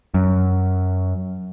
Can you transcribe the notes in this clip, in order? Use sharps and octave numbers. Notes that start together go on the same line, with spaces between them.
F#2